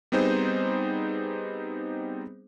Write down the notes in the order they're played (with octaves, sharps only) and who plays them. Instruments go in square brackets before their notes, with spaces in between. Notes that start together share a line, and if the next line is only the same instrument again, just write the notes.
[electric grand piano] G3 B3 C4 D#4 G#4 C5